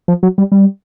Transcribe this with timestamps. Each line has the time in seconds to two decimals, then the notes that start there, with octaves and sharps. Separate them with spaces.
0.08 F3
0.23 F#3
0.38 G3
0.52 G3